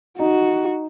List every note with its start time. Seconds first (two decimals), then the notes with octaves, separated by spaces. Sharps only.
0.19 D#4 F#4